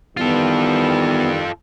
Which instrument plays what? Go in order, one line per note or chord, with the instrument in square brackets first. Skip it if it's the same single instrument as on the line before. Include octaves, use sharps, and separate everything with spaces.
[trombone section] D#3 E3 G3 [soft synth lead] B3 [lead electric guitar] F4 A4